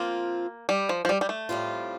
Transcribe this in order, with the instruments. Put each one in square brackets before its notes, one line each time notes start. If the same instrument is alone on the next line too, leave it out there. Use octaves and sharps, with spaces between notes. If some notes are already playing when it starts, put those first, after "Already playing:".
Already playing: [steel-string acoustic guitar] F3 C4 F4 [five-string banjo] A#3
[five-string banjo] G3
F3
F3
G3
G3
A3
[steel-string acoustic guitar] A2 G3 C4 F4